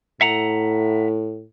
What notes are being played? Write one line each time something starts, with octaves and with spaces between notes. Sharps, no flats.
A2 E5 F#5 A#5